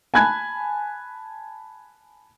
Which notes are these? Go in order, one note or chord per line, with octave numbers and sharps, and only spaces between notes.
G#5 A5 B5 F#6 G#6